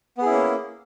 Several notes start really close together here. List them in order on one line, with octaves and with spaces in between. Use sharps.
B3 G#4 E4 C#4 A#3